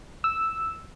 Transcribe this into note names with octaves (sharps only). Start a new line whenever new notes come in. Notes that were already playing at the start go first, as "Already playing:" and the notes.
E6